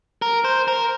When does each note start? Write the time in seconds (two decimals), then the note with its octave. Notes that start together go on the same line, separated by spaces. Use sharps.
0.22 A#4
0.44 C5
0.68 A#4